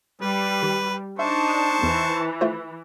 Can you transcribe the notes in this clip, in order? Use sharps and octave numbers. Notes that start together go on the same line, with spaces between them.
G3 B4
D#3
D4 D#4 C5 E5 A5 C#6
E2 E3
A3 F4 C5